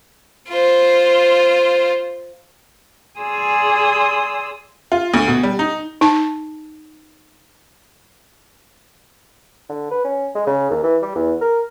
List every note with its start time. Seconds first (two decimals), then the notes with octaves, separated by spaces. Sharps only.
0.50 F4 C5
3.19 G#4 D5 G#5 C6 D#6 E6
4.92 F4
5.14 D2
5.28 B2
5.43 G3
5.59 D#4
6.01 D#4 A5
9.70 D3
9.91 B4
10.04 C#4
10.35 G#3
10.47 C#3
10.71 D#2
10.83 E3
11.02 G3
11.15 E2
11.41 A#4